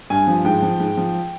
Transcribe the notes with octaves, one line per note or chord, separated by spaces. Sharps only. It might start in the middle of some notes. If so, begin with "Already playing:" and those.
G2 G#5
F3
G#2 G5
F3
G#2
F3